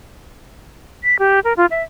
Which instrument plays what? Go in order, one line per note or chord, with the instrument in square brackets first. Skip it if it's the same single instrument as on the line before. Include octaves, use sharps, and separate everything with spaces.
[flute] B6
G4
A#4
F4
E5